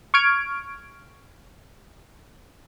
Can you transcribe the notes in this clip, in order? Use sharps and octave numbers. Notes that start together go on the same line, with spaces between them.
C#6 F6 G#6 D7